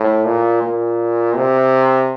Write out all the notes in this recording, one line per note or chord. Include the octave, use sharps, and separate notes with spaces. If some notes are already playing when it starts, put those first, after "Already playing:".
Already playing: A2
A#2
A#2
C3